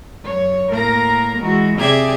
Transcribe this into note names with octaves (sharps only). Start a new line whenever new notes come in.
F#2 C#5
A2 A#3 A#4 A#5 A#6
E3 G#3 F#4
C3 G4 G#4 D5 E5 G#6